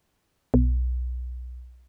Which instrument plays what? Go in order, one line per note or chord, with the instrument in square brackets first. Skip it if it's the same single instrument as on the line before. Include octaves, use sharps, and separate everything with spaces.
[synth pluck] B1